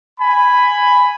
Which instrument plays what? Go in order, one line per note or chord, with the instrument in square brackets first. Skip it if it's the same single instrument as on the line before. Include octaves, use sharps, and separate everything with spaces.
[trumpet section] G#5 B5